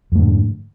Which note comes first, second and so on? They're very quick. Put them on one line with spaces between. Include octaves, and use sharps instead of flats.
F2 A3 D3 G#2